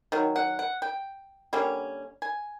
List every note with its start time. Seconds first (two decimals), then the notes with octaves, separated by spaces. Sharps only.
0.12 D#3 F#3
0.36 F#5
0.59 F#5
0.82 G5
1.53 D3 G3 A#3 C#4
2.22 G#5